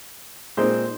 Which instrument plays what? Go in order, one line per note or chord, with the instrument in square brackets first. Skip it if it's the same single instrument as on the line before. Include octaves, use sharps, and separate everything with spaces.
[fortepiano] A#2 G#3 C4 D#4 C5